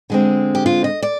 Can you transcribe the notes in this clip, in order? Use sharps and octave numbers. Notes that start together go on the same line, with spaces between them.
D3 G#3 C4
G4
F4
D#5
D5